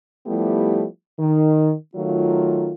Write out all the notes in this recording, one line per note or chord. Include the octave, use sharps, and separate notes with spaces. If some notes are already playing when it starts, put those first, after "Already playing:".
F3 G3 A3 B3 E4 G4
D#3
D#3 F#3 A3 F4